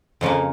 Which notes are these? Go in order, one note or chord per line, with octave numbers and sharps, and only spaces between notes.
F2 C#3 F3 A#3